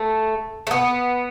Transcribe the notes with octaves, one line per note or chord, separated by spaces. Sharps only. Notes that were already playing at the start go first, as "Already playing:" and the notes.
Already playing: A3
A3
B3